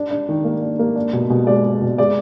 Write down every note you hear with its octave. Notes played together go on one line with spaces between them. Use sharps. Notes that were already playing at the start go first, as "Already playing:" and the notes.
Already playing: D4
D4
D#3
A#3
D4
A#3
D4
B2
B2
G#3 D5
G#3
B2
G#3 D5